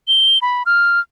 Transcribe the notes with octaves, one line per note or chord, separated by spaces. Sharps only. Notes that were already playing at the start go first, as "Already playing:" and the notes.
G7
B5
F6